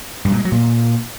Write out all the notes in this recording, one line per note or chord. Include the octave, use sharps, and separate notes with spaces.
G2
A#2
G#3
F#3
A#2